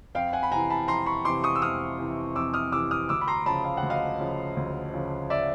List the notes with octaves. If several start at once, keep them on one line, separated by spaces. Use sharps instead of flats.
F2 F5 G5
F#5 G#5
B5
C3 E3 G#5 A#5
A5 B5
F2 A#5 C6
B5 C#6
C3 E3 C6 D6
C#6 D#6
E6
F2 D#6 F6
C3 E3
F2 D6 E6
D#6 F6
C3 E3 D6 E6
D#6 F6
D2 D6 E6
B5
A#5 C6
C#3 F3 A5 B5
F5
F#5
D2
D#5 F5
C#3 F3
D2
C#3 F3
D5 E5